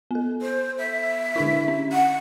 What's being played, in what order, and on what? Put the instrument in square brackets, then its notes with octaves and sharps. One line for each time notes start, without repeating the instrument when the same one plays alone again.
[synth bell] B3 A4
[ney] C5
E5
[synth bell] D3 D4 E4
C#4
[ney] F#5